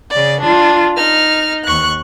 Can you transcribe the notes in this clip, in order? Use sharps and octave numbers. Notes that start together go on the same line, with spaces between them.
C#3 D5
D4 F4
D#4 F6
D#2 C#6 F#6